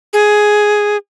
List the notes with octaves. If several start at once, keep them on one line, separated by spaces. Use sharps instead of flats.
G#4